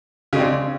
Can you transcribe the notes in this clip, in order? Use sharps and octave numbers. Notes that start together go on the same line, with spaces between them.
C#3 G#3 C4 D4